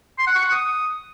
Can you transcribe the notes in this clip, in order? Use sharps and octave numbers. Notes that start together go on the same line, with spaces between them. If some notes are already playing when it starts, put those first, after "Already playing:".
C6
F#5
C#6
F#5
D#6